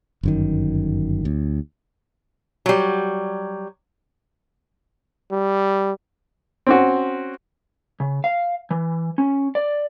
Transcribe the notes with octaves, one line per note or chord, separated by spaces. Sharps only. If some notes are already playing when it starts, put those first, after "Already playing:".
G1 F#2 D#3
D2
F#3 G3
G3
C4 C#4 F#4
C#3
F5
E3
C#4
D5